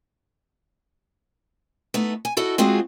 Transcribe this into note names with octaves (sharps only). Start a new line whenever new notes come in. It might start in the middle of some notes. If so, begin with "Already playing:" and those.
A3 B3 D#4
G#5
E4 F#4 A4 D#5
G#3 C4 F4 F#4 G#4